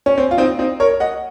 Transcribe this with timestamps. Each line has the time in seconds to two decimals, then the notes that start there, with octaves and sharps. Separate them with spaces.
0.06 C#4
0.18 C4
0.31 F4
0.38 C4 D#4
0.59 C4 D#4
0.80 A#4 C#5
1.00 D#5 F#5